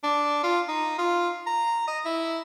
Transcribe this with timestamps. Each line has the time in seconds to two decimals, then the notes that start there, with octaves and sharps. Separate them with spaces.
0.04 D4
0.43 F4
0.69 D#4
0.99 F4
1.47 A#5
1.88 D#5
2.05 E4